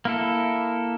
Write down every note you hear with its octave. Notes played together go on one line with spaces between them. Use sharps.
A#3 E4 A4